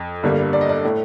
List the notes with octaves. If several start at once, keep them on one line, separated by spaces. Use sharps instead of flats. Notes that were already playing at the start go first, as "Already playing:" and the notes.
Already playing: F2
G1 G2 D3 G3 A#3
D5
D#5
D5
A2 A3